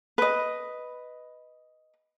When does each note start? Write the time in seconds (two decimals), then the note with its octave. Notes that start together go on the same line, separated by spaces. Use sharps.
0.18 B4 D#5